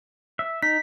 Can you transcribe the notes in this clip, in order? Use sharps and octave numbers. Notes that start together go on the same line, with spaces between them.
E5
D#4 B6